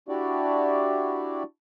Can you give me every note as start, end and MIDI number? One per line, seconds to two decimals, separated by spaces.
0.08 1.43 62
0.08 1.43 64
0.08 1.43 66
0.08 1.43 67
0.08 1.43 74